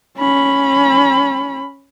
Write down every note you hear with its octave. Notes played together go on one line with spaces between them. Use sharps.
C#4 B5